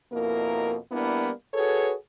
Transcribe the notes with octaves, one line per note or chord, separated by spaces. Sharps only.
F2 B2 A#3 E4 A#4
G3 A#3 B3 D4 E4
F#4 G#4 A4 B4 C#5